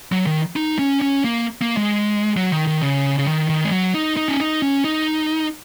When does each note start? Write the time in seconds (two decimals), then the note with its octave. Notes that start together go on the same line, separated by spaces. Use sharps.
0.12 F#3
0.27 D#3
0.56 D#4
0.79 C#4
1.01 C#4
1.24 A#3
1.62 A#3
1.77 G#3
2.37 F#3
2.52 D#3
2.67 D#3
2.83 C#3
3.19 C#3
3.27 D#3
3.50 D#3
3.64 G#3
3.72 F#3
3.94 D#4
4.17 D#4
4.28 C#4
4.40 D#4
4.62 C#4
4.84 D#4